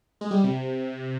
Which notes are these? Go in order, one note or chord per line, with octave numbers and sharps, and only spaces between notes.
G#3
G3
C3